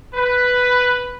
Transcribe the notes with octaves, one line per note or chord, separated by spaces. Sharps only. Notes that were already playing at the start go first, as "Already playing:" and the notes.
B4